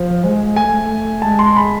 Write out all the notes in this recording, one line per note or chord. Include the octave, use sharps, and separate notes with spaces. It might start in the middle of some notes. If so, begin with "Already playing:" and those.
Already playing: F3
G#3
A3 G#5
G#3 A5
C6
B5